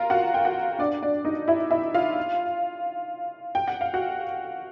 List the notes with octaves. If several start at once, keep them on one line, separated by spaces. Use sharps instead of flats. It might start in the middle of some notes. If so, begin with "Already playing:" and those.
Already playing: F4 A#4 F5 A#5
F#4 F#5
G5
F#4 F#5
D4 D5
D4 D5
D#4 D#5
E4 E5
E4 E5
F4 F5
G5
F#5
F5
F#4 F#5